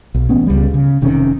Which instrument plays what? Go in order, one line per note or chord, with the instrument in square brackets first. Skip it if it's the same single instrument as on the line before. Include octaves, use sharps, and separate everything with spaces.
[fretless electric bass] B1
A1 B3 C#4
C#2 G3
C#3
F1 C3 D#3 C#4